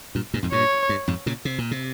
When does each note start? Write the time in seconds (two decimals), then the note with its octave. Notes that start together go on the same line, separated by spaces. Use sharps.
0.15 G2 A#2
0.34 G2 A#2
0.43 F2 G#2
0.52 G2 A#2 C#5
0.89 G2
1.08 F2 G#2
1.26 A#2 C#3
1.45 C3
1.58 A#2
1.71 C3